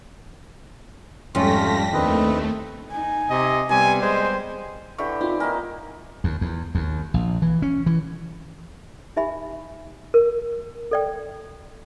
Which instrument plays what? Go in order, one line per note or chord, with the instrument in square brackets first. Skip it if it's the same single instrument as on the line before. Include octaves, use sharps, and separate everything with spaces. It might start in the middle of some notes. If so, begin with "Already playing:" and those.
[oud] F2 [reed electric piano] G#2 C#4 [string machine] G3 A#6 B6 [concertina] A3 F4
[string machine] D#2 A3 [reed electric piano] D#3 D4 [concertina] C4 B4 D#5
[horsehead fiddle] D#4 G#5
[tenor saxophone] C3 [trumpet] D#5
[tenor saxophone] C3 [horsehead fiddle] G3 B3 [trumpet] G#5
[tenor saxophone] G#3 [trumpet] C5
[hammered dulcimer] D3 E3 G4 [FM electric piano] C#6
[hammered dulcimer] C4 [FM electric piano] D#4 F4
[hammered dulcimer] D#3 A#3 [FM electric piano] G#5
[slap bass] D#2
E2
D#2
A#1
E3
C#4
E3
[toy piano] D#4 G4 E5 G#5 B5
A#4
A4 D5 G5